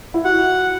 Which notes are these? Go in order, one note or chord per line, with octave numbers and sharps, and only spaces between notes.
E4
F#4 F#5